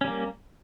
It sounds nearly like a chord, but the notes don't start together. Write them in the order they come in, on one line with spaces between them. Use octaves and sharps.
C#4 G3 A#3